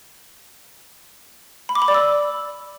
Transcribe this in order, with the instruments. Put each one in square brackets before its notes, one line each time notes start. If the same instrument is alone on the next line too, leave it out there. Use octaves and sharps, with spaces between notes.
[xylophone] B5
D6
B5
D5
E6